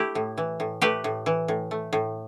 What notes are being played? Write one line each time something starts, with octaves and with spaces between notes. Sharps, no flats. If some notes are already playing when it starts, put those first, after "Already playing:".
Already playing: A3 E4 G4
A2
E3
A2
A3 G4 B4
A2
E3
A2
A3
A2